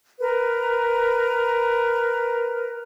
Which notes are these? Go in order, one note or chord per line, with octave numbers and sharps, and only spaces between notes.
A#4 B4